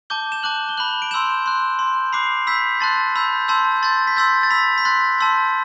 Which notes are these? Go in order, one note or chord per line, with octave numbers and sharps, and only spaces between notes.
A5 D6 G6 G7
E7
A5 D6 F#6 F#7
G7
B5 F#6 F#7
D7
C6 E6 G6 E7
C6 F#6
C6 G6
B5 D6 F#6 C7
B5 E6 G6 B6
A5 C6 F#6 A6
B5 E6 G6
A5 C6 E6 G6
C6 G6 A6
B6
C6 E6 G6 A6
A6
B5 E6 G6 B6
B6
C6 F#6 A6
A5 C6 E6 G6